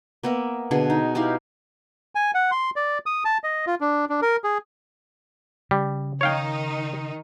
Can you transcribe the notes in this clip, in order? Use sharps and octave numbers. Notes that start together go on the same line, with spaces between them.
A#3 B3 A#4 E5
B2 D3 G#4
D#4
D#4 E4 G4 F5
G#5
F#5
C6
D5
D#6
A5
D#5
F4
D4
D4
A#4
G#4
C#3 G3
D#3 D#4 C#5 F5 G5